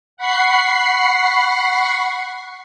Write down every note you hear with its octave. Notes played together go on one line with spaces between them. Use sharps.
F#5 B5 C#6 C7